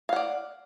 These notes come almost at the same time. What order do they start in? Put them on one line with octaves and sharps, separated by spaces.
F5 F#5 D5